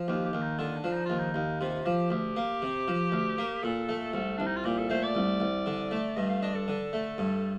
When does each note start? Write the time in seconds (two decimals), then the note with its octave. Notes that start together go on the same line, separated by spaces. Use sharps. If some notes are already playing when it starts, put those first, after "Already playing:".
Already playing: F3
0.08 D#2 G4
0.25 G4
0.33 D#2
0.42 D#4
0.58 D3 F4
0.76 D4
0.84 F3
0.93 D#4
1.06 D#2 F4
1.19 D#4
1.34 D#2
1.61 C3 F4
1.85 F3 G4
2.10 D2 G4
2.37 A#3
2.62 C3
2.88 F3
3.12 D2
3.38 A#3
3.63 A#2 A4
3.89 A3
4.13 C2 A4
4.38 C2 D4
4.47 D#4
4.56 F4
4.64 A#2 G4
4.78 A4
4.90 A3 C5
5.03 D5
5.15 C2
5.40 C2
5.66 D3
5.91 A3
6.17 G2 D#5
6.29 F5
6.42 D4 D#5
6.55 A4
6.68 D3
6.93 A3
7.18 G2